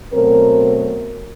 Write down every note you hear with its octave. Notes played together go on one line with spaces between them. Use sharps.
B2 F#3 A3 C4 A#4